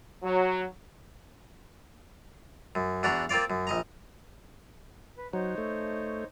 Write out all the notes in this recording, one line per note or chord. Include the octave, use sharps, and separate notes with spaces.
F#3
F#2
E2 D4 F#4 A#5
A#3 C4 F4 D5 F5
F#2
A#1 D#5 A#5
B4
F#3 D#4 C5 C#5
A3